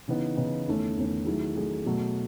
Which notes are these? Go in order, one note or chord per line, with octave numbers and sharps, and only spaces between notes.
C#3 E3 B3 D#4
C#3 E3 B3 D#4
E2 D#3 A3 C#4
E2 D#3 A3 C#4
D#3 F#3 A3 E4 G#4
D#3 F#3 A3 E4 G#4
B2 F#3 A3